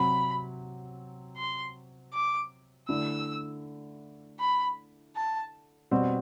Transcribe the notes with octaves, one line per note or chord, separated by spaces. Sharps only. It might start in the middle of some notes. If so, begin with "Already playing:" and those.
Already playing: C3 F#3 C4 B5
C6
D6
D3 A3 E4 E6
B5
A5
B2 G3 C4 F#4